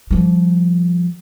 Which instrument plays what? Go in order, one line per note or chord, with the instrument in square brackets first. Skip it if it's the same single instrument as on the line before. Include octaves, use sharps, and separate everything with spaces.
[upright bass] F3 G3